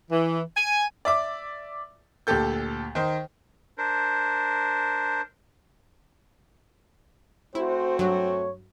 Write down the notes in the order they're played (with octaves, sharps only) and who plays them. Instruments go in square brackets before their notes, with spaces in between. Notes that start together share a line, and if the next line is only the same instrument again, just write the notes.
[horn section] E3
G#5
[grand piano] D5 E5 D6
D2 A#2 G4 A4 G6
D#3 C5
[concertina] D4 A#4 C5
[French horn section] A3 C4 F#4 [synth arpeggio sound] E4 [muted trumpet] C5
[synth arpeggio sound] G2 F#3 [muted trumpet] C#5